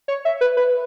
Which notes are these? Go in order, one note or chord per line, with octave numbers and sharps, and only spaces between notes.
C#5
E5
B4
B4